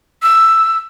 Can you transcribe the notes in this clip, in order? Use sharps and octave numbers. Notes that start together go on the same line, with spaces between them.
E6